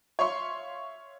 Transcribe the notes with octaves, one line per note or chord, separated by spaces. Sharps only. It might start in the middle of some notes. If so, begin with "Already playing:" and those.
C#5 E5 F5 C6 C#6